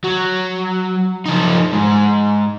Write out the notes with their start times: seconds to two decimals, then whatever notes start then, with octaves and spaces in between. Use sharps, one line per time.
0.04 F#3
1.26 F3 D#4
1.74 G#2